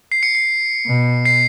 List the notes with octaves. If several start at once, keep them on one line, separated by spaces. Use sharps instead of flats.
C7
C#7
C7
B2
C7